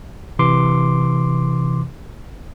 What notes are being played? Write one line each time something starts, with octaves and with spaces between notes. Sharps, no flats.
C3 E3 C6 D6